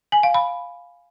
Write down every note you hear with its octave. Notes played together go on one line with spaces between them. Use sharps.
G#5
F5
B5